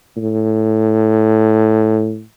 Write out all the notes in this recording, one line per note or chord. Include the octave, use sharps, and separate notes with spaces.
A2